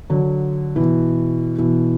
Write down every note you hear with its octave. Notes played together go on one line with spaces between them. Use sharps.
D3 F#3
B2 E3
B2 E3